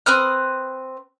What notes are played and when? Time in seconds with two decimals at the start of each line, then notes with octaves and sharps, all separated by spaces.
0.06 C4 B4 D#6 F6